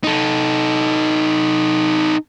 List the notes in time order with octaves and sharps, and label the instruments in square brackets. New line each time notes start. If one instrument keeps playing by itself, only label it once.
[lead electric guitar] D#4 A4